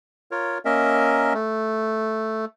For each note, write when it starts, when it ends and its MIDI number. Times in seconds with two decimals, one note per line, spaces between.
0.31 0.58 65
0.31 0.58 70
0.31 0.58 73
0.65 1.33 58
0.65 1.33 61
0.65 1.33 70
0.65 1.33 75
0.65 1.33 76
1.34 2.45 57